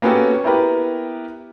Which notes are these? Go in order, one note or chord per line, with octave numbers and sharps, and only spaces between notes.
A#3 B3 C#4 F#4 G4 A4
B3 E4 G4 A#4 B4